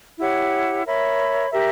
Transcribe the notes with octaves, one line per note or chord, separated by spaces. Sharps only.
E4 G4 C#5 F#5
A#4 C#5 E5 B5
G4 A#4 E5